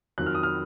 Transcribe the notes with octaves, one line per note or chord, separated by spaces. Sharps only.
F2 D#3 F#3 F#6
F6
D#6
F6